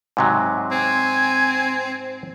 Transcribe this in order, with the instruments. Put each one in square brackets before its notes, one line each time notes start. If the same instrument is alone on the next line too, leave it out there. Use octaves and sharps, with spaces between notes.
[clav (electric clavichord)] G#2 C3 F#3
[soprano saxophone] C4 [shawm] G#5